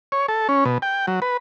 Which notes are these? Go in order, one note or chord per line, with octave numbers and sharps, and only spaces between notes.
C#5
A4
C#4
B2
G5
F#3
B4